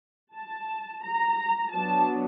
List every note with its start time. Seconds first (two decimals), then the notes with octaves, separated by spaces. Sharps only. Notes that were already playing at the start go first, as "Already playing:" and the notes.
0.35 A5
1.04 A#5
1.73 F#3 B3 D4 A5